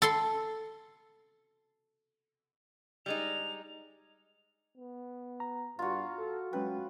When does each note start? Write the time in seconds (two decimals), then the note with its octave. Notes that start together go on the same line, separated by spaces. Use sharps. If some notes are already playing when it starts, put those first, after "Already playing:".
0.02 A4 C6
3.06 G3 G#3 D#4 F7
4.77 B3
5.40 A#5
5.79 G2 F4 F#4
6.18 A4
6.53 F#3 G#3 C#4 B4 G5